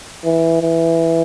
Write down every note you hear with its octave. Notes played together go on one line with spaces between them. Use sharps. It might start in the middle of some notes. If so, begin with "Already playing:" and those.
E3
E3